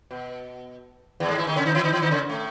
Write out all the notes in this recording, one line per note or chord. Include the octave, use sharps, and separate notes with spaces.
B2
E2 E3
G#2 G#3
E3 E4
D#3 D#4
C#3 C#4
D#3 D#4
E3 E4
D#3 D#4
E3 E4
D#3 D#4
C#3 C#4
A2 A3